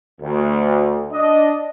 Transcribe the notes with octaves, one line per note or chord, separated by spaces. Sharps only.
D2
D4 D#5